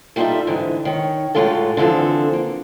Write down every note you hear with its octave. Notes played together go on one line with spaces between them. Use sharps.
G3 D#4 F4 G4 A4 E5
G#2 D3 E3
D#3 C#5
A2 F#3 G#3 F4 A4
D3 E3 F3 C4 A4
A#3